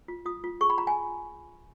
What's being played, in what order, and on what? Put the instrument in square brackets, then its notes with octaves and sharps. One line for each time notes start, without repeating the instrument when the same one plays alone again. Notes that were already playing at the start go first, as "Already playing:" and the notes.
[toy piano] F4
F4 D#6
F4
G#4 C#6
B5
F4 A#5
G#5